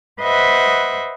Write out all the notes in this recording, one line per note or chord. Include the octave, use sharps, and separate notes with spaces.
B4 C5 D#5 E5 F#5